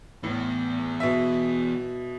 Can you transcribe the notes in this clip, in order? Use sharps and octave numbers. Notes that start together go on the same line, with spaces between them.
A2 E3 B3
B2 E5